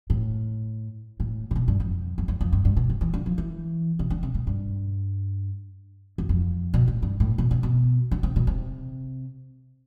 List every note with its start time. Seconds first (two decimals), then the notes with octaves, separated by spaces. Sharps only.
0.10 A2
1.20 A2
1.51 C3
1.56 B2
1.68 G2
1.80 F2
2.18 F2
2.28 E2
2.41 F2
2.53 G2
2.65 G2
2.77 B2
2.89 C3
3.01 E3
3.14 D3
3.26 F3
3.38 E3
3.99 C3
4.10 D3
4.23 C3
4.34 B2
4.47 G2
6.18 E2
6.29 F2
6.74 B2
6.88 A2
7.02 G2
7.20 A2
7.38 B2
7.51 C3
7.63 B2
8.11 D3
8.23 C3
8.36 B2
8.47 C3